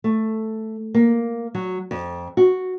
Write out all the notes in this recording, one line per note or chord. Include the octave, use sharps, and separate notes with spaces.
A3
A#3
F#3
F2
F#4